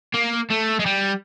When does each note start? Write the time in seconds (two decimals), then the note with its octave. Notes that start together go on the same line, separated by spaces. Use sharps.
0.14 A#3
0.50 A3
0.80 G#3
0.86 G3